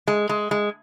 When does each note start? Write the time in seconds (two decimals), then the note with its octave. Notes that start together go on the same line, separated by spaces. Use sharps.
0.08 G#3
0.29 G#3
0.51 G#3